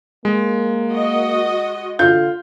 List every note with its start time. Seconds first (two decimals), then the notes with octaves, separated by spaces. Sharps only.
0.25 G#3 A#3
0.91 F#4 D#5
1.99 D3 F4 G6